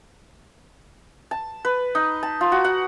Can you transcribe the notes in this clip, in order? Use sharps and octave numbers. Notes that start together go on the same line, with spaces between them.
A5
B4
D#4
A5
F4
F#4
F#5